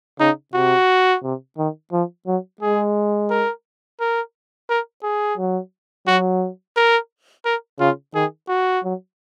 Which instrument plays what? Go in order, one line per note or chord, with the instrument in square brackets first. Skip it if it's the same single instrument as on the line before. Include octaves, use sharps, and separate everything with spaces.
[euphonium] C#3 [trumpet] D#4
[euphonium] C3 [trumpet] F#4
[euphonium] C3
D#3
F3
F#3
[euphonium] G#3 [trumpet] G#4
[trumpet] A#4
A#4
A#4
G#4
[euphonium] F#3
[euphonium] F#3 [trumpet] F#4
[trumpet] A#4
A#4
[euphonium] C#3 [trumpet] F4
[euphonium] D#3 [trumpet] G#4
[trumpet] F#4
[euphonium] F#3